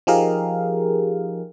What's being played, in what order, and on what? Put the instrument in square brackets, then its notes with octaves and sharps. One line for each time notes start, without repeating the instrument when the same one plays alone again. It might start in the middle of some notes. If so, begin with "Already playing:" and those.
[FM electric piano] F3 D#4 G4 G#4 A#4 F5